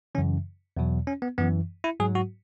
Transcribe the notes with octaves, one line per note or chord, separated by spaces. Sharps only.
F#2 C#3 E3 C#4
E2 B2 F#3
C#4
B3
F#2 E3 B3
E4
G#2 F#3 G#4
F#4